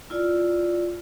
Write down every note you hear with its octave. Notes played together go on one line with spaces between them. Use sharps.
E4 F4 D5